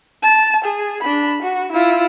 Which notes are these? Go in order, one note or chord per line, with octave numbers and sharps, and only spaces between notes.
A5
G#4
D4 B5
F#4
E4 F4